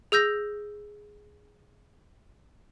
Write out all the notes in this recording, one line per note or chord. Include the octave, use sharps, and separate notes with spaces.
G#4 E6 G6 A#6